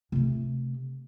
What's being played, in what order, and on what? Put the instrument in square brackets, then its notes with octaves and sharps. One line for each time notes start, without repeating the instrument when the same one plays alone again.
[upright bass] C3 A3